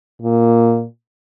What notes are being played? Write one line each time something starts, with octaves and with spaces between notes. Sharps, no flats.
A#2